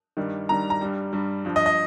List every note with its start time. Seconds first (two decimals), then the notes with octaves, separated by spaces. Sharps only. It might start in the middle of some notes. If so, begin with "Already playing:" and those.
0.17 G2 D#3 G3
0.49 G2 D#3 G3 A#5
0.70 A#5
0.81 G2 G3
1.13 G2 G3
1.45 G2 F3
1.56 D#5
1.66 D#5